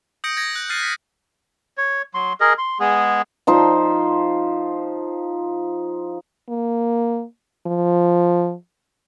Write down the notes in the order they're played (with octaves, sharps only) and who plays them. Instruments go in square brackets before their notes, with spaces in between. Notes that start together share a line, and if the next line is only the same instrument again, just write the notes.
[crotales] D#6 G6 A#6 C#7 D7
G#6 A#6
F#6
F6 F#6 A6 C7 D#7
B6
[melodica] C#5
F#3 C6
G#4 A#4 D#5
C6
G#3 B3 G#4
[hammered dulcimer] F3 D#4 C5
[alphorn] A#3
F3